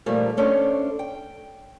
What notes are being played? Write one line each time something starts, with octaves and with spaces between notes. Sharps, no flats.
A#2 D#3 F3 G3 A3 A#3
A3 C#4 D4 A4 C5
G5